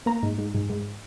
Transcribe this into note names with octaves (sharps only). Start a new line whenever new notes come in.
A#3 A#5
G#2
G#2
G#2
G#2